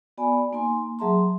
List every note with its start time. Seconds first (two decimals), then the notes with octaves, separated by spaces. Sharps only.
0.18 B3 F#4 D5 G#5 B5
0.53 A#3 D#4 G#5 A#5 C6
0.99 F#3 G#4 E5 A5 A#5 C6